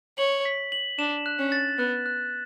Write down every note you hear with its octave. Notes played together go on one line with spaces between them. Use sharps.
C#5 F#7
B6
F#7
D4 E7
F#6
C#4
A6
B3 F#6
F#6